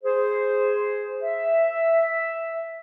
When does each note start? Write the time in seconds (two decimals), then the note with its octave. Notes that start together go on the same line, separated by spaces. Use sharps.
0.04 G#4 C5
1.21 E5